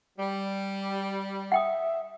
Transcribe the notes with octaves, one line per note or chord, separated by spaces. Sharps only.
G3
E5 F#5 G5 D#6